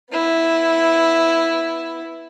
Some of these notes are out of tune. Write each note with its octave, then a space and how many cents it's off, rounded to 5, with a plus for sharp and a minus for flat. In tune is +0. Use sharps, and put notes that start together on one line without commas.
B3 +0 E4 +0